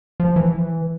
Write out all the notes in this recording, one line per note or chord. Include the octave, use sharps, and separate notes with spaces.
F3
E3